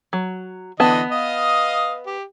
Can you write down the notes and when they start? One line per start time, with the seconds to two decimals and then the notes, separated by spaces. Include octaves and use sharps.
0.13 F#3
0.80 D3 E3 B3 D#5 A5
1.11 D#5 F5 D#6
2.06 G4